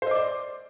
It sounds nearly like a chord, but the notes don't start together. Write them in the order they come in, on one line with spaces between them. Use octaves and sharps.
C5 D#5 D6 D5